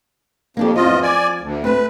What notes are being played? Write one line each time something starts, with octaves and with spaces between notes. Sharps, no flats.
F2 A#3 D4 G4
E2 F3 C4 F4 D#5
D5 G#5
D2
A3 C4 B4